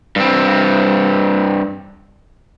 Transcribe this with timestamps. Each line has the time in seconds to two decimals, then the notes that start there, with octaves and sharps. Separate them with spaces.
0.16 G2 C4